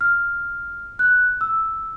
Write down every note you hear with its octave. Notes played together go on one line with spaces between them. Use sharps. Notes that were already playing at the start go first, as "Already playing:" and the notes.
F6
F#6
E6